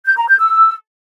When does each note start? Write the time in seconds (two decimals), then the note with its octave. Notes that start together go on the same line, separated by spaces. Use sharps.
0.06 G6
0.17 A#5
0.28 G6
0.39 E6